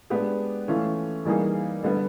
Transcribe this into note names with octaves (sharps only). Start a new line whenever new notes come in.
G#3 B3 D4 G4
E3 A3 C#4 F4
E3 G3 A#3 D#4 G#4
D3 G3 B3